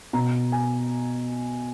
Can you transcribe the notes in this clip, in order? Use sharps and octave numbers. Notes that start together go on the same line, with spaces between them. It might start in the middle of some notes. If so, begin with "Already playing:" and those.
B2 A#5
G#5